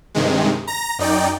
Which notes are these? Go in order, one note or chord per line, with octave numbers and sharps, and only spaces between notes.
G2 C3 D#3 G#3
A#5 A#6
F#2 D#4 D5 G5